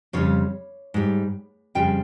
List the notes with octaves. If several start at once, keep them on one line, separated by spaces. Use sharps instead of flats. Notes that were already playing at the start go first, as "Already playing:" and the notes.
F2 C#3 G3 C#5
G#2 G3
F2 C#3 G3 G5